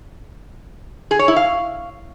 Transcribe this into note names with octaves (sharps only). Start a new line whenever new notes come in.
G#4
C#5
E4
F5